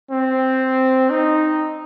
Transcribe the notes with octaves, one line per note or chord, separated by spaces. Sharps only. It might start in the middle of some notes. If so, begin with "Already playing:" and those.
C4
D#4